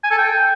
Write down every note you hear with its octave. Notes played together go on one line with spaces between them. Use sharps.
G#5
A4
G5